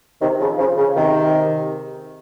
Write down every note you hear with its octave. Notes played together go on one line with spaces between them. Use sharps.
C3 D#3
C#3 F3
C#3 F3
C#3
C3 D#3